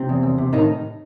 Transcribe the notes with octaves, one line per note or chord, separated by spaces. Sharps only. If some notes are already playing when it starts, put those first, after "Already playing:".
Already playing: C3 C4
E2
E2
C3
A2 D#3 D#4